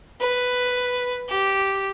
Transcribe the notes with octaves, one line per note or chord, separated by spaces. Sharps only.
B4
G4